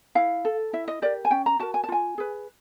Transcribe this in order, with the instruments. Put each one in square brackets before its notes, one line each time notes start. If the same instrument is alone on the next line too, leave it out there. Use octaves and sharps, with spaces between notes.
[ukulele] E4 F5
A4
E4 E5
D#5
G4 A#4 D5
G#5
C#4 G5
A#5
F#4 A#4 A5
G#5
A5
F4 G#5
G#4 B4